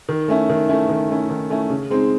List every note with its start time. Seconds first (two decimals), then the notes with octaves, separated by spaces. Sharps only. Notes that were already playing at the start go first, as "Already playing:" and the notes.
0.09 D#3
0.28 A3 C#4 E4
0.50 D#3
0.69 A3 C#4 E4
0.89 D#3
1.10 A3 C#4 E4
1.30 D#3
1.50 A3 C#4 E4
1.70 C#3
1.90 G#3 C4 D#4